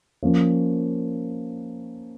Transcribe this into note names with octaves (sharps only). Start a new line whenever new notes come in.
F3 A#3 C#4